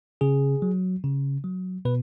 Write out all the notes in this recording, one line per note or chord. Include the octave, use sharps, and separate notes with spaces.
C#3 G#4
F#3
C#3
F#3
B2 B4